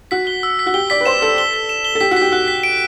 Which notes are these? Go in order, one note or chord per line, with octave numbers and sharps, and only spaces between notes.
F#4 B6
G7
E6
B6
F#4
G4 G7
D5 B6
B4
C5 E7
A4 E6
G7
G7
E7
G7
A4
G4 B6
F#4
G4 B6
F#4 F#6
B6
D7